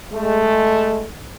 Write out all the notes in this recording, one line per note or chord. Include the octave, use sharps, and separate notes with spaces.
G#3 A3